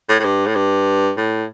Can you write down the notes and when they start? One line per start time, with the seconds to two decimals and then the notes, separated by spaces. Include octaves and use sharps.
0.09 A2
0.19 A2
0.24 G2
0.46 A2
0.55 G2
1.17 A2